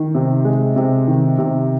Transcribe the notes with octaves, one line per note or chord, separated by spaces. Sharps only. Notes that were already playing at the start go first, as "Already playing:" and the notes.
Already playing: D#3
C3
G#3
C3
D#3
C3